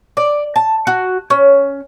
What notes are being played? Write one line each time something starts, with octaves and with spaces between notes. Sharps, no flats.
D5
A5
F#4
C#4